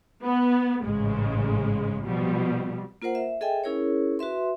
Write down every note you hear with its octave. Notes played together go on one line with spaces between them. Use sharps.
B3
A1 G#2 C#3 G#3
B2 F3 G3
A#3 F4 A#4 C5 F#5
E5
G#4 A4 D#5 E5 G5 G#5
C#4 E4 G#4 A#4 C#5
F#4 B4 E5 C6